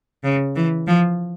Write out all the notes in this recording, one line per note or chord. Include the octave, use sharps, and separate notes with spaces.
C#3
E3
F3